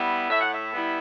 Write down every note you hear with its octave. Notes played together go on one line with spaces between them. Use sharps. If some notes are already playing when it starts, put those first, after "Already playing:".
Already playing: G3 B3 E4
A2 E5
F#5
E5
G3 B3 E4